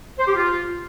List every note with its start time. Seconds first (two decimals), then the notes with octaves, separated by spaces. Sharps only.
0.19 C5
0.27 G4
0.36 F4